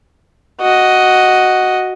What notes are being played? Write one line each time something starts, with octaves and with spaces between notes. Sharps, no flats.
F#4 D#5